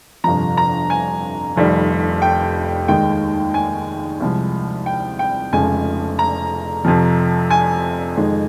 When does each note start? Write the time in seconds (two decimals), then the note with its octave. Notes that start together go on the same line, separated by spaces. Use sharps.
0.24 G1 F2 C3 F3 A#5
0.57 A#5
0.90 G#5
1.56 F1 F2 D#3 G3
2.22 G5
2.88 D#2 D#3 G#3 G5
3.54 G#5
4.20 C2 C3 F3 G#3
4.86 G5
5.19 G5
5.52 F1 F2 C#3 F3 G#3 G#5
6.19 A#5
6.85 F2 C3 F3
7.50 G#5
8.17 F2 D#3 G#3